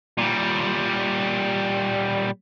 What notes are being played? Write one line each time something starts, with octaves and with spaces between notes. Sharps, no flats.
A#2 G3